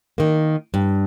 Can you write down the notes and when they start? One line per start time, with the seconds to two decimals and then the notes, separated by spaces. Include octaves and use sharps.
0.18 D#3 A#3
0.74 G2